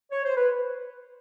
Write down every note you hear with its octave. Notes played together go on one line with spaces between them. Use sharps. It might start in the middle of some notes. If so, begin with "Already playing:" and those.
C#5
C5
B4